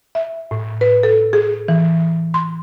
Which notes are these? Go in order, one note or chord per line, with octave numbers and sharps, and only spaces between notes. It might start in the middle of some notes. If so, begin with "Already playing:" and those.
E5
A2
B4
A4
G#4
E3
C6